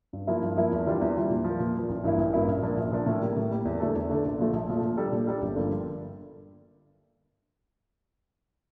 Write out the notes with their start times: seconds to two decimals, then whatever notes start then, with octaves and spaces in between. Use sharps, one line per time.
0.13 G2
0.27 F3 A#3 E4
0.42 G2
0.57 F3 A#3 E4
0.72 E2
0.86 E3 G3 D4 F4
1.01 E2
1.16 E3 G3 D4 F4
1.30 A#2
1.44 F3 A#3
1.59 A#2
1.75 F3 A#3
1.89 A1
2.04 G2 E3 A#3 E4
2.18 A1
2.34 G2 E3 A#3 E4
2.48 A#1
2.62 A#2 F3 A#3 D4
2.77 A#1
2.92 A#2 F3 A#3 D4
3.06 A2
3.21 G3 A#3
3.36 A2
3.51 G3 A#3
3.65 E2
3.80 D3 A3 D4 A4
3.95 E2
4.09 D3 A3 D4 A4
4.25 A#1
4.38 A#2 F3 A3
4.53 A#1
4.68 A#2 F3 A3
4.82 A#2
4.97 G3 D4 A4
5.12 A#2
5.27 G3 D4 A4
5.42 G1
5.56 G2 D3 F3 A#3